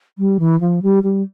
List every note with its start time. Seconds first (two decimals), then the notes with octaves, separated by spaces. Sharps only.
0.18 G3
0.40 E3
0.61 F3
0.83 G3
1.03 G3